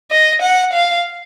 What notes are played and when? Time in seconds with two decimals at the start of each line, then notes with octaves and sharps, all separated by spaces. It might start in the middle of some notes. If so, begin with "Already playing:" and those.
0.11 D#5
0.42 F#5
0.73 F5